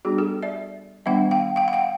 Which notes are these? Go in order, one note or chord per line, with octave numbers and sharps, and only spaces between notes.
G3 B3 D4 F#4 G#4
G4 A4
D5 E5
D#3 G3 B3 D4 E5 F#5
F5 G5
F5 G5
F#5
F5 G5